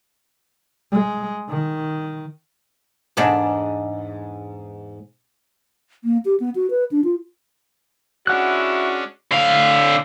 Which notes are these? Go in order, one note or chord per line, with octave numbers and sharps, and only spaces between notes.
G#3
D#3
E2 G#2 D4
A#3
G4
B3
F#4
B4
D4
F4
G#3 C#4 D4 E4 F#4 F#5 F#6
D3 F5